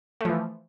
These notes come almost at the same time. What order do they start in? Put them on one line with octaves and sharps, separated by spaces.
A3 F3 E3